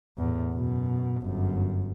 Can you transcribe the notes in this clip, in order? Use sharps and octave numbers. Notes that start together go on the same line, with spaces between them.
E2 A2
F#2 B2
G1 F#2